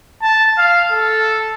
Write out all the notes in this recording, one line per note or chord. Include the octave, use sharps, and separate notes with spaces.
A5
F5
A4